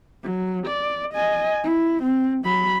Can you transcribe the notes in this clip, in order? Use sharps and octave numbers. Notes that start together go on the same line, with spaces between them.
F#3
D5
D#5 G#5
E4
C4
F#3 B5